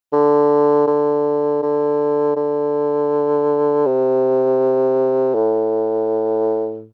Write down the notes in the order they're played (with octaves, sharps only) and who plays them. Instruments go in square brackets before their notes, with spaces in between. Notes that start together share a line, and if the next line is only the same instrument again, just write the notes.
[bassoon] D3
D3
D3
D3
C3
A2